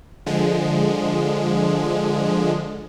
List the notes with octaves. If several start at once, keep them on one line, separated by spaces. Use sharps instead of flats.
D3 F3 G#3